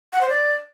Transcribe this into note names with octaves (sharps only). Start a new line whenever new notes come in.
F#5
C5
D5